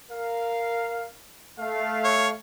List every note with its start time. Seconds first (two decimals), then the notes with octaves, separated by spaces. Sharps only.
0.11 A#4 F5
1.59 A3 F5
2.05 C#5